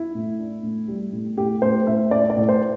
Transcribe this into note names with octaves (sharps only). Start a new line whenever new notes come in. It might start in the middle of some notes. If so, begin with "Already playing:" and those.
Already playing: E4
A2
D4
A2
G3
A2
A2 G4
A2 C5
A2 E5
A2 D5
D5
A2
C5